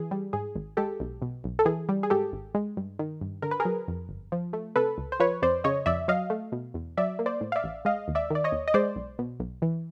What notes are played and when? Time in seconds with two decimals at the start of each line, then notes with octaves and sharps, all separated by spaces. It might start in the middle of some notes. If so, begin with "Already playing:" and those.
Already playing: E3 G#4
0.11 G3
0.33 G#2 G#4
0.56 G#1
0.77 G#3 G4 A4
1.00 B1
1.22 B2
1.44 B1
1.59 A4
1.65 E3 G#4
1.89 G3
2.03 G#4
2.10 G#2 G4 A4
2.32 G#1
2.55 G#3
2.77 G2
2.99 D#3
3.21 G2
3.42 D3 A#4
3.51 B4
3.60 G#4 A#4
3.65 F#3
3.88 F2
4.09 G1
4.32 F3
4.53 A3
4.76 C3 A4 B4
4.98 C#2
5.12 C5
5.20 F3 B4 C#5
5.42 F2 C5 D5
5.64 C#3 C#5 D#5
5.86 F2 D5 E5
6.08 F#3 D#5 F5
6.30 A3
6.52 B2
6.74 E2
6.97 F#3 D5 E5
7.19 A#3
7.26 C5 D5
7.41 A2
7.52 F5
7.56 D5 E5
7.64 A1
7.85 G#3 D#5 F5
8.08 D#2
8.15 D5 E5
8.30 D#3 D5
8.44 C#5 D#5
8.52 D#2
8.68 D#5
8.74 G#3 C5 D5
8.96 B1
9.19 B2
9.40 B1
9.62 E3